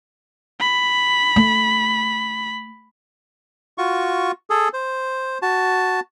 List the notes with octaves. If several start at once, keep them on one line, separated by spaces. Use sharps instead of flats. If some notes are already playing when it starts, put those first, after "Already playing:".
B5
A3
F4 F#4 C#6
G#4 A4
C5
F#4 A5